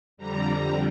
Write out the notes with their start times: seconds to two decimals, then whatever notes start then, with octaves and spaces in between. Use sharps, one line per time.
0.17 F2 D3 G3 A#5